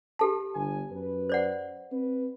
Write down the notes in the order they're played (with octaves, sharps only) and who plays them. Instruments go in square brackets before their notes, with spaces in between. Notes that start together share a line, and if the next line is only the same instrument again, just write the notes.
[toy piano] G4 A4 A5
[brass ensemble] G1 G#5
F#2 B4
[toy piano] C5 D5 F#5
[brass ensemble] C4 B4